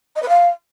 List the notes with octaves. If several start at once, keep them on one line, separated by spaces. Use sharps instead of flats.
D#5
B4
F5